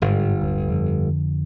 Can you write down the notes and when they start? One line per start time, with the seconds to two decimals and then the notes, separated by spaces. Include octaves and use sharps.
0.02 G1 G#2
0.41 D1
0.69 F2 D3